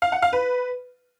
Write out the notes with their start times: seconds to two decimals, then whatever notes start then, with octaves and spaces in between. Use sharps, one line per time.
0.02 F5
0.12 F#5
0.22 F5
0.33 B4